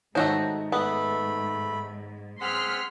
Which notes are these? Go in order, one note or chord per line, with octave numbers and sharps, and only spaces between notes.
G#2 D#3 A3 D#4 F#4 C5 C#5
A3 B3 B5
C4 G#4 F#5 C6 F6 B6